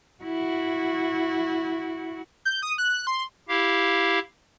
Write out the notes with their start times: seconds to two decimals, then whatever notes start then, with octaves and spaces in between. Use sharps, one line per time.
0.23 E4 F#4
2.45 G6
2.62 D#6
2.78 F#6
3.07 C6
3.49 E4 G4 F5